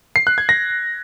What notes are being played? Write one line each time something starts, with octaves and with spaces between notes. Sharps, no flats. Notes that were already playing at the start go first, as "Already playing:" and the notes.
C7
F#6
G#6
A#6